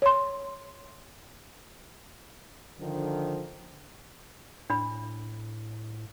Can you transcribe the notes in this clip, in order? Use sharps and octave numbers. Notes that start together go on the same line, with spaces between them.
C#5 C6
D3 D#3 F3
A2 D4 B5